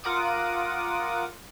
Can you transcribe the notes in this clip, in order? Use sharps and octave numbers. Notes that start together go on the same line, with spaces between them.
F4 A#4 F#5 D6 D#6